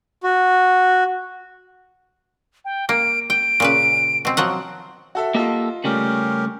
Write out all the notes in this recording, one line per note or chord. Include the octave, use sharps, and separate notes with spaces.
F#4
G5
A#3 D7
G5 D7
A#2 C#3 B4
B2 C4
F3 F#3 F#5
F#4 A4 E5
A#3 F4 G4 A4 D#5
C#3 G3 A3 C#4 G4 A#4